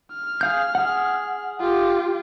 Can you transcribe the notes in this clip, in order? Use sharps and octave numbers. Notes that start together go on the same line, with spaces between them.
F6
G#4 F5 G6
G#4 F#5
F4 G4